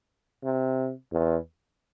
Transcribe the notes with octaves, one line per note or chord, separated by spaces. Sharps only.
C3
E2